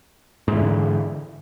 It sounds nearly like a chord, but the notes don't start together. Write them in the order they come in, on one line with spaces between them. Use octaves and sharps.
G#2 E3 D3